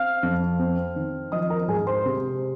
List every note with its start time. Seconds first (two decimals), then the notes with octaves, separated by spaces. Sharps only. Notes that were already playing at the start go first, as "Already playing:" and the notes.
Already playing: C4 F5 F6
0.23 F2
0.59 C4
0.96 D#3
1.32 F3 D#5 D#6
1.50 A#4 A#5
1.68 G#2 G#4 G#5
1.87 C5 C6
2.06 C3